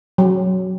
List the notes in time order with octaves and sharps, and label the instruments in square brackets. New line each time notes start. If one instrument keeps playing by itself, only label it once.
[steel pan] F#3